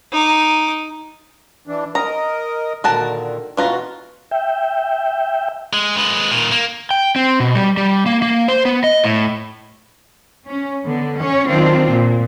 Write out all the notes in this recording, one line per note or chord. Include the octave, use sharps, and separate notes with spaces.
D#4 D6
E3 D4
A#4 D#5 A#5
A#2 D3 D#3 F#4 A#4 A5
B2 E3 F4 F#4 A#5
E5 G5
G#3
G#3 B4
A#2 D#3
A#3
G5
C4
B2
G3
G3
A#3
A#3
C5
B3
D#5
A2
C#4
D3 B3
C#4 C#5
D#3 F#3 C4 D4 F4
A#2